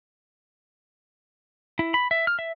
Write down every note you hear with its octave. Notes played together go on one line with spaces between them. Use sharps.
E4
B5
E5
F6
E5